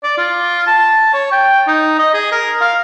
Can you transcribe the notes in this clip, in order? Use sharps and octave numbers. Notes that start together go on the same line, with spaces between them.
D5
F4
A5
C#5
G5
D#4
D#5
G#4
A#4
F5